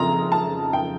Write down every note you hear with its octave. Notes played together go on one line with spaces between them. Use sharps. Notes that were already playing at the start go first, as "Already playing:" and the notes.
Already playing: F2 C#3 A#5 C6
A5
G5